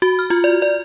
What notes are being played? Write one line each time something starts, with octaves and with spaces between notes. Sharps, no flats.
F#4
F6
F4
D5
D5